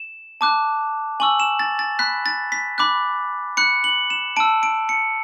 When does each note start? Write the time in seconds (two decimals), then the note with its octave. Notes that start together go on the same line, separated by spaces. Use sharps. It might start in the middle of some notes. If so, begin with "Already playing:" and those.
Already playing: E7
0.41 A5 D6 F#6
1.20 G#5 C#6 E6 F#7
1.40 E7
1.59 A6
1.79 A6
1.99 B5 F#6 B6
2.26 A6
2.52 B6
2.78 B5 D6 F#6
3.57 B5 F#6 C#7
3.84 F#7
4.10 E7
4.37 A5 E6 D7
4.63 D7
4.89 C#7